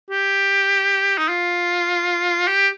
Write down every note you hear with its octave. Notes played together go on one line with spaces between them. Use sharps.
G4
D#4
F4
G4